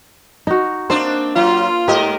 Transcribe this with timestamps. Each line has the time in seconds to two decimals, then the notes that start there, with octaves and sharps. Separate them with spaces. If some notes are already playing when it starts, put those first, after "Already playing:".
0.47 D#4 F#4
0.90 A#3 C4 D4 C5
1.36 F#3 F4
1.88 G#2 G4 A#4 D#5